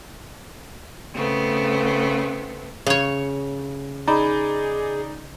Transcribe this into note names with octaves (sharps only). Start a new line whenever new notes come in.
C#3 A3 B3 C4
C#3 G#4 C#5
D#4 G#4 D5 A#5 B5